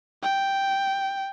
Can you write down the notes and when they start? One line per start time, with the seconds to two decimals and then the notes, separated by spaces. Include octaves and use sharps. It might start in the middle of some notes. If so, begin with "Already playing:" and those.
0.23 G5